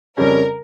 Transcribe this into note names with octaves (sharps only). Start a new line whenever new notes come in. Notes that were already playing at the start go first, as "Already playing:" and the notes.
F2 C#3 G3 C#4 A#4